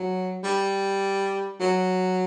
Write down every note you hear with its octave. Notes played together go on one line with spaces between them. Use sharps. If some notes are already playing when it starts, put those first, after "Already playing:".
Already playing: F#3
G3
F#3